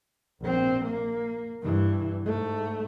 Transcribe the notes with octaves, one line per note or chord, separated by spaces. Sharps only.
A#1 C4
A#3
G2 E3
G#2 A3